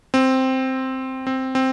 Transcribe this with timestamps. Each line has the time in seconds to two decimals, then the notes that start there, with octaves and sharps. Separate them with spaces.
0.14 C4
1.27 C4
1.55 C4